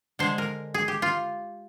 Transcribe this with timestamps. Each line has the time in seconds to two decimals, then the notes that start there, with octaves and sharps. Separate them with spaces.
0.19 D3 G#3 C5
0.38 A#4
0.74 G#4
0.88 G4
1.02 F4